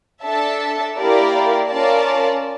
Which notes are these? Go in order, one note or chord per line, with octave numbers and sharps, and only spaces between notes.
D4 A4 E5 A5
A#3 E4 G4 A#4 D5
C#4 F4 A#4 D5 A5